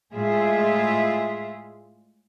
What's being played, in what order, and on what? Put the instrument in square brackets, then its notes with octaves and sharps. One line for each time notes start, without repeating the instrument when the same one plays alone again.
[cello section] A2 G#3 F4 G#4 E5